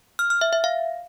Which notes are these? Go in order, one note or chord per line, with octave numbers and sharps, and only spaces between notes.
F6
F6
E5
E5
F5